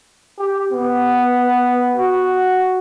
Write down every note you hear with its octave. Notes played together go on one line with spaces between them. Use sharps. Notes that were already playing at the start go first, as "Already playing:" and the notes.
G4
B3
F#4